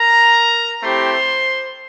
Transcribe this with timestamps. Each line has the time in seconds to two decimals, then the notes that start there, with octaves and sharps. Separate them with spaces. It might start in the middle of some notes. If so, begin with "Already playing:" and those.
Already playing: A#4 A#5
0.82 A3 C4 E4 G4 C5 C6